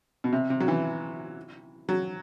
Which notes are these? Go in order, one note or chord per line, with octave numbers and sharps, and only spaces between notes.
B2
C3
C3
F#3
E3
F#3